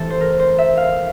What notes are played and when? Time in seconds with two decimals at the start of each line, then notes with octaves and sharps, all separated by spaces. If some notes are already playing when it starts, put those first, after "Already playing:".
Already playing: E3 A3 C4 G4 A4
0.10 C5
0.20 A#4
0.39 C5
0.58 E5
0.77 F5